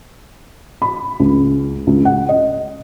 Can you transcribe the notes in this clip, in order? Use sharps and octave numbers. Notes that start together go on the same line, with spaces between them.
B5
C#2
C#2
F#5
D#5